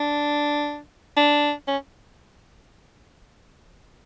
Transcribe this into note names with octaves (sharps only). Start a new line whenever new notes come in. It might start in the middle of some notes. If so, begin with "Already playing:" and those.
Already playing: D4
D4
C#4